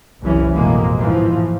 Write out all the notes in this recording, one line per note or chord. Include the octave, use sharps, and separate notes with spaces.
F#1 C2 F#2 E3 C#4
A1 F2 B2 G#3 A#3
G#2 E3 F3